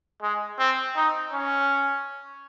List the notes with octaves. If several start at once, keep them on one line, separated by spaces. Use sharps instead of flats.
G#3
C4
D#4
C#4